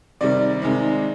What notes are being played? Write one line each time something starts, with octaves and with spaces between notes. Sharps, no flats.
C3 D#3 G3 D5
C3 D#3 G#3